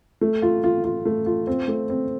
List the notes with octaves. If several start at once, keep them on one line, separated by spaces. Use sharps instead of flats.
A3
F4
F4
F4
A3
F4
C4
A3
C4